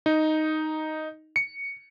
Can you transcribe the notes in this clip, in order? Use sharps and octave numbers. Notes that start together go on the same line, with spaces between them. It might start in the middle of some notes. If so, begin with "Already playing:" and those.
D#4
C#7